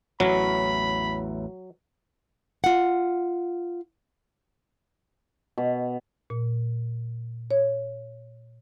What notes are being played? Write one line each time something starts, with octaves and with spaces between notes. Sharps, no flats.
A1 E2 F#3 B5
F4 F#5
B2
A#2
C#5